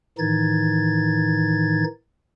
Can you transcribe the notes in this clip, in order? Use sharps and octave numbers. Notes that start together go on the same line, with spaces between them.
A2 D#3 E3 D#4 G#6 A6